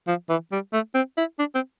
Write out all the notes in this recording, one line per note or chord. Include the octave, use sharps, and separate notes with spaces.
F3
E3
G3
A3
C4
E4
D4
C4